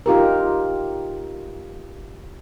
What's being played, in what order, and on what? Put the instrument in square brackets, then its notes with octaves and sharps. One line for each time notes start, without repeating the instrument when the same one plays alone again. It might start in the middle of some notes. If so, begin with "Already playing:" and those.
[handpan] D#4 F4 G4 A#4